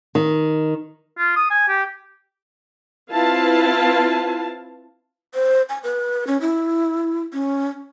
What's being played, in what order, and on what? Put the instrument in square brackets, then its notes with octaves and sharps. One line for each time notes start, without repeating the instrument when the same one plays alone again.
[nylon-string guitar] D#3
[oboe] F4
D#6
G#5
G4
[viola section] C4 E4 F4 B4 F5 A5
[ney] C5
G#5
B4
C#4
E4
C#4